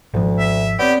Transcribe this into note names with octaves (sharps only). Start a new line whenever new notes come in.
G#1 D2 F3
E5
B3 C4 G4 C#5 D5